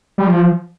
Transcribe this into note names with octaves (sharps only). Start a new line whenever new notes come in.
G3
F3